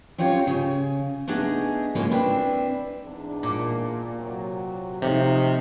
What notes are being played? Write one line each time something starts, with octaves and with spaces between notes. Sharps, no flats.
C4 C#4 F4 G4 A#4 C#5
C#3 G#5
A3 B3 D4 D#4 G#4
A2 C#3 G#3 A#3 F4 C#5
C4 D4 E4 B4 D5
E2 G#2 D4
A#2
C3 F#3
C3 F3 A3 D#4